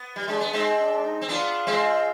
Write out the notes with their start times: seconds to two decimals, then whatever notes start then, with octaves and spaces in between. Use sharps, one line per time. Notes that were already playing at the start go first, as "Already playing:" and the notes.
Already playing: B3
0.16 G3
0.28 G#3 D4
0.41 B3
0.53 G#3 C4 D#4
0.78 D4
0.92 D4
1.04 D#4
1.21 C4
1.29 B3 D4 F4
1.67 G#3 C4